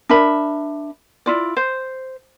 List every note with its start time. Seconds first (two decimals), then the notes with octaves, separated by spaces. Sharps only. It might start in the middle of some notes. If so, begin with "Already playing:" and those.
0.09 D4 A#4 E5 B5
1.26 E4 F4 D5
1.57 C5